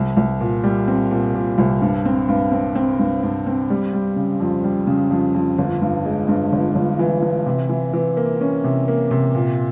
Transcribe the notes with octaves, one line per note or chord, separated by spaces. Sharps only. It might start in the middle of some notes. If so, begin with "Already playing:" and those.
Already playing: C2
C2
A#2
G3
C4
A#2
A#2
C2
G2
C4
G2
C4
C4
G2
G2
C4
G3
G3
C#3
F2
G3
C#3
F2
F2
G1
G2
G#3
G2
G1
G1
E3
E3
C3
E3
E3
A#3
C#4
C3
A#3
C3
A#2